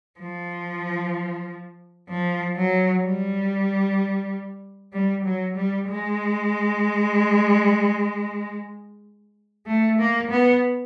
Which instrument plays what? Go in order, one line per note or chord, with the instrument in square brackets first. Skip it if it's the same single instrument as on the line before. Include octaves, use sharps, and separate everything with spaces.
[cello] F3
F3
F#3
G3
G3
F#3
G3
G#3
A3
A#3
B3